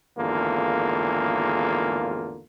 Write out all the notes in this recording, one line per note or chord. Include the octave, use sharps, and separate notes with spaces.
G#1 E2 D3 A#3 F4